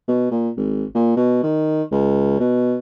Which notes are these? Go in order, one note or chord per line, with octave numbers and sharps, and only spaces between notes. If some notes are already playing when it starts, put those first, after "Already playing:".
B2
A#2
G#1
A#2
B2
D#3
C#2
B2